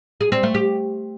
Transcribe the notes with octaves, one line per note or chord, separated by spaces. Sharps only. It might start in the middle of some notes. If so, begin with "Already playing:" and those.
G#4
C4
A3
G4